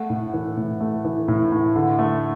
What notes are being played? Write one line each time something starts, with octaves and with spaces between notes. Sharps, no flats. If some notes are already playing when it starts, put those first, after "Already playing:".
Already playing: A3 F#5
A2
E3
A2
A3
E3
A2
A2
D3
A3